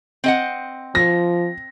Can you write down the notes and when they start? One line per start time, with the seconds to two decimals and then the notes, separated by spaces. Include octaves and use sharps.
0.24 C4 D#5 F#5
0.95 F3 A#6